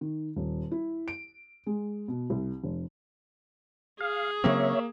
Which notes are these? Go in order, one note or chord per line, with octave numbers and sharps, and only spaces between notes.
D#3
D#1
E4
D7
G#3
B2
C2
F1
G#4 F5
C#3 F#3 A#3 C4 C#5 E5